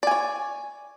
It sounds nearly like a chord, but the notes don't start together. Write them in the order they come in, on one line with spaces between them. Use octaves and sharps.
D5 G#5 C#5